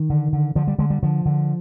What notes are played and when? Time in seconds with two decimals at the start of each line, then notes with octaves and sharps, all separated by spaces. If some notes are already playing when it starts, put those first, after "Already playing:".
Already playing: D#3
0.10 D3
0.33 D3
0.56 D3 F3
0.68 G3
0.78 D3 G#3
0.90 G3
1.03 D3 F3
1.26 D3